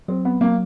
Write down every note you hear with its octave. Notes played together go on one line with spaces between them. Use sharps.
F#3 C4
B3
F#3 A#3